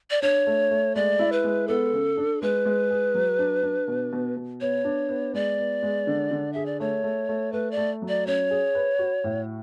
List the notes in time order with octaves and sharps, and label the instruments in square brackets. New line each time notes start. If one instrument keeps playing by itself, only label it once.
[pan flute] D5
[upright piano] D4 [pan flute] C#5
[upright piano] A3
A3
[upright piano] G#3 [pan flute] D5
[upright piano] E4
[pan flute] B4
[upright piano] G#3
[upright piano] B3 [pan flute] A4
[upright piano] C#3
D4
[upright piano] G#3 [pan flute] B4
[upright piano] G#3
G#4
F#3
D4
D4
B2
B2
B2
[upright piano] B3 [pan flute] C#5
[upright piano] D4
B3
[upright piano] G#3 [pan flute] D5
[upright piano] B3
G#3
D3
D3
[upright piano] G#4 [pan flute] E5
[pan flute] D5
[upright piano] A3 [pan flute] C#5
[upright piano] A3
A3
[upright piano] A3 [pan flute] B4
[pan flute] D5
[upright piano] A3
F#3
[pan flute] D5
[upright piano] C#4 [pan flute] C#5
[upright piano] G#4
B4
F#4
A2